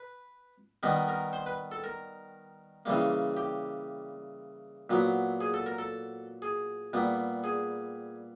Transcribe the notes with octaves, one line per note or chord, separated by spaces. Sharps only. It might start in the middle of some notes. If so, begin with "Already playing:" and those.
Already playing: B4
D#3 G3 B3 A#4
A#4
C5
B4
A4
A#4
C#3 E3 G3 A#3
G4
A#2 F#3 B3
G#4
A4
A#4
A4
G#4
A#2 G3 B3
G#4